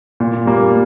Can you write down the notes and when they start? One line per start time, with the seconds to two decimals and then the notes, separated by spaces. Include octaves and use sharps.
0.20 A#2
0.45 G3 A#3